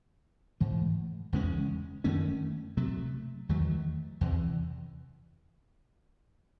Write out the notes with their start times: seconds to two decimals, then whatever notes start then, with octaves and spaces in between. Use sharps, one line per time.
0.60 G#2 E3 A3
1.33 E2 C#3 G#3 C#4
2.04 F#2 D#3 A3 C#4
2.77 C3 F#3 A3
3.49 E2 D#3 F#3 A3
4.21 E2 C3 E3